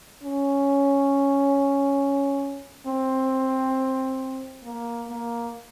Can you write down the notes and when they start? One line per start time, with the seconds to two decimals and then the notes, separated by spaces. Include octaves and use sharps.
0.23 C#4
2.87 C4
4.64 A#3
5.08 A#3